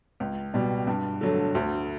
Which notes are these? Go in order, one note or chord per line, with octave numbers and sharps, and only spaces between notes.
C#2
B2 G3
G2
D3 F#3 A3
D2